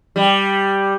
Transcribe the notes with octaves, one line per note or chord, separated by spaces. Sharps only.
G3